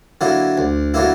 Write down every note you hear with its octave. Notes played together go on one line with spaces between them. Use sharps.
D3 F#3 A#3 E4
D2
D3 F#3 A#3 E4